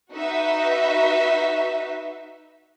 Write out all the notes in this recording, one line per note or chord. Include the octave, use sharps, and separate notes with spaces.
D#4 F#4 B4 E5